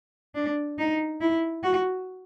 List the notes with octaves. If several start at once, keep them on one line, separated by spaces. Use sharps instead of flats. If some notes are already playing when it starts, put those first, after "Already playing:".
D4
D#4
E4
F#4